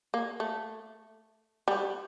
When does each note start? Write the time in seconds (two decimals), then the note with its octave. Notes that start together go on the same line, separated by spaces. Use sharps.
0.14 A#3
0.40 A3
1.68 G3